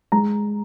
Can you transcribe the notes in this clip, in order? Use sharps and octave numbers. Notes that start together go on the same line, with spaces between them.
G#3 A#5